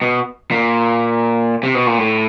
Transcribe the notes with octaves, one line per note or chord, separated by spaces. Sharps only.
B2
A#2
C3
B2
A#2
A2